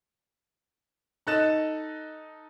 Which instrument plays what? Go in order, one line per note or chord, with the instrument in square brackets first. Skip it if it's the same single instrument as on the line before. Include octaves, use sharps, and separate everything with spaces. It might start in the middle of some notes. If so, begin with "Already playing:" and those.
[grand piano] D#4 A4 D#5 F#6 A6 E7